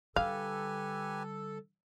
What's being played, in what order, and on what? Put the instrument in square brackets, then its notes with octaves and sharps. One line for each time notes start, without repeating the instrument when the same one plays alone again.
[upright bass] D3 G3 [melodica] G4 B4 G#5 [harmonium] A4 [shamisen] F5